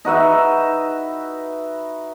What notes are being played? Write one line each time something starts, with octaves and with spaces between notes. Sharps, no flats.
D#4 F#4 B4 E5